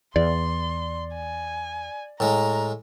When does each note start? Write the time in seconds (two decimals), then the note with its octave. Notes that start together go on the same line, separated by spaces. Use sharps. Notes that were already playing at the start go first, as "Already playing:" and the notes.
0.16 E2 D5 C6
1.15 G#5
2.20 A2 G#3 A#5